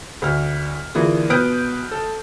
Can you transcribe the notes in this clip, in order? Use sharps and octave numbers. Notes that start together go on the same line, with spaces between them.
D2 F6
D3 E3 A#3 F4 G#4
B2 B4 D#6 F6 G6 D7
A4